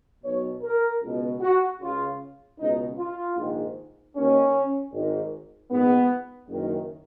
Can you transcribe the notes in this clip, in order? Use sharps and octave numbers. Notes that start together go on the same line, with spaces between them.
B1 B2 C#5
A#4
C#2 B2
F#4
C#2 C#3 F4
C#2 B2 D#4
F4
A#1 G#2 D#3
D#2 D#3 C#4
G#1 G#2 D#3
A#1 G#2 D#3 B3
F#1 F#2 D#3